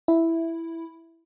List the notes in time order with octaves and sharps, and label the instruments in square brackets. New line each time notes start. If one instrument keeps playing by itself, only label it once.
[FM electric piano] E4